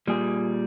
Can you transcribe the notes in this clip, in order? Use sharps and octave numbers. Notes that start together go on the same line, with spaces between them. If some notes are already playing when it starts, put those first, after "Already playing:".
A#2 G3 G#4